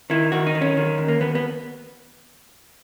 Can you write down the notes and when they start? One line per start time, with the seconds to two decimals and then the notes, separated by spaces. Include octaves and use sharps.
0.10 D#3 E4
0.32 D#3 F#4
0.47 D#4
0.55 D#3
0.61 C#4
0.77 D#3
0.98 D#2
1.08 A#3
1.20 D#2 B3
1.35 B3